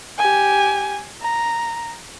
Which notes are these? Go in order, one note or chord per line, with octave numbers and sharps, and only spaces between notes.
G4 G#5
A#5